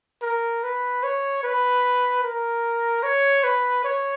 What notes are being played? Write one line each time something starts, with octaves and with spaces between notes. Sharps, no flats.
A#4
B4
C#5
B4
A#4
C#5
B4
C#5